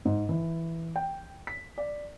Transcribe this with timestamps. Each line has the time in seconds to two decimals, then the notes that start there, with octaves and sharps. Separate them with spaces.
0.05 G#2
0.29 E3
0.96 G5
1.47 B6
1.78 D5